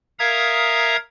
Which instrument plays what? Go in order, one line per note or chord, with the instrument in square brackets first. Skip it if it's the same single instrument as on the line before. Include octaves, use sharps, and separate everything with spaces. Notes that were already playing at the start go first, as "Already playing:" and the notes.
[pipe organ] A#4 E5 F5 A#5 D#6 G#6